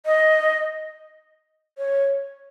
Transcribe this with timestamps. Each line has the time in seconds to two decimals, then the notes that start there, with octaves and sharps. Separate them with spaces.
0.06 D#5
1.78 C#5